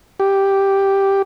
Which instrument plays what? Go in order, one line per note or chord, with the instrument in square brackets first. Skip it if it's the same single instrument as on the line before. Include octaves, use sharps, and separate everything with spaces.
[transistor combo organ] G4